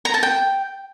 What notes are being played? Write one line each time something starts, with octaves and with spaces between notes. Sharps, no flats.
A#5
A5
G5